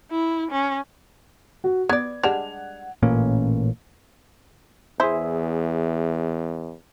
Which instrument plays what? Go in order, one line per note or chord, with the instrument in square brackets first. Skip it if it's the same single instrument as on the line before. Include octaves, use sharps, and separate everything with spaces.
[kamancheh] E4
C#4
[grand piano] F#4
[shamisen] B3 D5 [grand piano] G#6
[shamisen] G3 G#3 D4 [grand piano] F#5 F7
[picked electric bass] A1 A#2 A#3 C#4
[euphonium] E2 [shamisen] E4 C5 [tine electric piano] G#4 E5